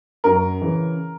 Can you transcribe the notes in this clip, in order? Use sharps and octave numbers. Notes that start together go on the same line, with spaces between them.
F#2 A#4
C#3 E3